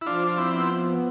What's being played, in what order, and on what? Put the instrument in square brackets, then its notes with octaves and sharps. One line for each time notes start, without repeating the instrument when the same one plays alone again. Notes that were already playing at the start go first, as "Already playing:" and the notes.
[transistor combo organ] E4
[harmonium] F3 [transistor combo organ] D4 F4
[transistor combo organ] F4
C4 E4
[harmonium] B3